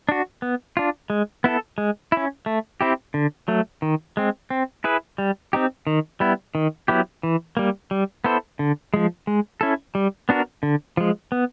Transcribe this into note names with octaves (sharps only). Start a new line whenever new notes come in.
D4 F#4
B3
D4 F4
G#3
B3 E4 A4
G#3
C#4 E4
A3
C4 E4 G4
D3
F#3 A3
D#3
G#3 C4
C4
E4 G#4 B4
G3
C4 D#4 G4
D#3
G3 B3 E4
D#3
F#3 B3 E4 G4
E3
G3 A#3
G3
B3 E4 A4 C5
D3
F3 G#3
G#3
C#4 E4 A4
G3
B3 D4 F#4 A#4
D3
F3 G#3
B3